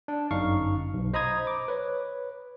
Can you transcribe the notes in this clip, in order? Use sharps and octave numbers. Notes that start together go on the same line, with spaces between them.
D4
G1 F#2 D#4 F5 C#6
B1
C5 D#5 A#5 B5 D#6 G#6
D6
B4 C#5